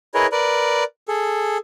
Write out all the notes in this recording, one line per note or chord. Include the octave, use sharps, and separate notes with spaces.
E4 G#4 A#4 B4 C#5 D#5
A#4 B4 D5
G#4 A4